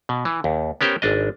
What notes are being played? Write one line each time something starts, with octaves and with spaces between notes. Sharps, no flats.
B2
E3
D#2
B3 C#4 G4 A#4 C5
G#1 D4 D#5